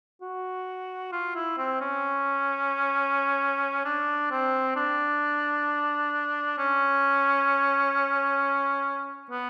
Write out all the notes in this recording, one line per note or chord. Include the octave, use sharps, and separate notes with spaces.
F#4
F4
E4
C4
C#4
D4
C4
D4
C#4
B3